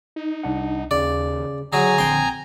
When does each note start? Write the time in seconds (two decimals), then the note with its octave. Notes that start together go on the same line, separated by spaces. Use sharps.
0.16 D#4
0.44 C2 D4 F#5
0.91 D#2 C#3 D5
1.73 D3 F#3 G#4 G#5 A#5
1.98 A#1 C4 G5 C6 D#6